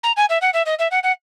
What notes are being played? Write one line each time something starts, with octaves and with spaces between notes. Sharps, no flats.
A#5
G#5
E5
F#5
E5
D#5
E5
F#5
F#5